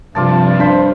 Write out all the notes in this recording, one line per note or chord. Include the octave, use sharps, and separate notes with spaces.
G2 C3 F3 F4 D5 A5
D4 C5 B5